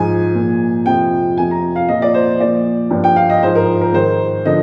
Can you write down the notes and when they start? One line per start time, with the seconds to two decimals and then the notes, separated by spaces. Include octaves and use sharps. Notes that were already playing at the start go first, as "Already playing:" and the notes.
Already playing: G#2 F3 G#5
0.34 A#2
0.40 F3
0.86 F2 C3 F3 G5
1.38 F2 C3 F3 G#5
1.51 A#5
1.76 F5
1.88 A#2 F3 D#5
2.02 D5
2.14 C5
2.40 A#2 F3 D5
2.91 G2 F3
3.04 G5
3.16 F5
3.30 D#5
3.43 G#2 F3 C5
3.55 A#4
3.81 A#4
3.93 G#2 D#3 C5
4.45 D3 F3 D#5